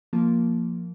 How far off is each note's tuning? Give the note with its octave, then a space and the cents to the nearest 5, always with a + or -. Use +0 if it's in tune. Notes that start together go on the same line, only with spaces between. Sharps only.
F3 +0 A#3 -5